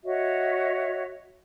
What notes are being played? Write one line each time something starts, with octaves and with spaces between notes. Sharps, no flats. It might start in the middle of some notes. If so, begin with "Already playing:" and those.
F#4 C#5 D#5 E5